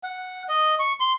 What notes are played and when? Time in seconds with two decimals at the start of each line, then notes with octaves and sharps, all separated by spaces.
0.03 F#5
0.49 D#5
0.79 C#6
1.00 C6